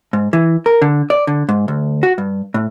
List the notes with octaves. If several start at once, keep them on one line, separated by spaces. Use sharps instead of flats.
G#2
E3
A#4
D3
D5
D3
G#2
D2
F#4
G2
A2